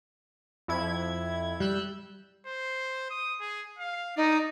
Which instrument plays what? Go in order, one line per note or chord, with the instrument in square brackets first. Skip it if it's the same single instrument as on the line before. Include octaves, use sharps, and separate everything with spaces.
[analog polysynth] F2 E4 G#6
[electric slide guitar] G3 [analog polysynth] E6 F#6 G6
[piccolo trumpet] C5
D#6
G#4
F5
[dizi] D#4 [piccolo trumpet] D5